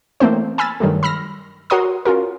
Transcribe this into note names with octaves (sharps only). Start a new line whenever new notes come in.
E3 A3 A#3 C4 C5
G#5 B5 E6 F6 A6
G2 D#3 F#3 G3 A3
B5 E6 F6 A#6
F#4 A#4 C#5 A#5 C6 D#6
C#4 F4 F#4 A#4